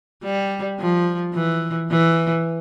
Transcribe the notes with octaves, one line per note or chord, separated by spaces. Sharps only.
G3
F3
E3
E3